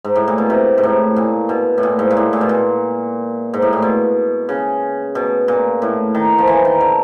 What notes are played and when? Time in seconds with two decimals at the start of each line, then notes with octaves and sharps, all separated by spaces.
0.05 G#2
0.16 A2
0.28 A#2
0.38 B2
0.50 C3
0.78 G#2
0.83 A2
1.16 A#2
1.49 B2
1.78 A2
1.83 A#2
1.99 G#2
2.11 A#2
2.17 A2
2.33 A#2
2.41 B2
2.49 A#2
3.54 G#2
3.62 A2
3.73 A#2
3.82 B2
4.49 C#3
5.15 B2
5.48 A#2
5.82 A2
6.15 D#3
6.38 F3
6.47 E3
6.65 D#3
6.81 D3